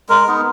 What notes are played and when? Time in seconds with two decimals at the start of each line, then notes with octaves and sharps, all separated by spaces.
0.09 G#3 A#4
0.28 B3 D#4